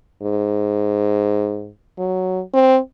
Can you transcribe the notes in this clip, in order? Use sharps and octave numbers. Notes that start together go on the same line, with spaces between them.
G#2
F#3
C4